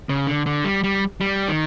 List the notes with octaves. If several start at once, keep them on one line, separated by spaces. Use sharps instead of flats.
C#3
D3
D3
G3
G3
G3
D#3